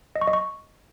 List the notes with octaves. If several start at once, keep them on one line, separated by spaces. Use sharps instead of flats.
D#5
C#6
D#5
C#6